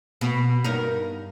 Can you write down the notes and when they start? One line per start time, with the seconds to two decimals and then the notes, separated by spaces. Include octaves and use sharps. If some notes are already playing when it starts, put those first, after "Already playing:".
0.21 B2
0.64 G2 D#4 A#4